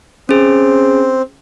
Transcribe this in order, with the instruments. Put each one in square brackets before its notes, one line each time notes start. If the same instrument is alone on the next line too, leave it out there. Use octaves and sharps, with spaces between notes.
[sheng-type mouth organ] C4 [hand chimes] C#4 G#4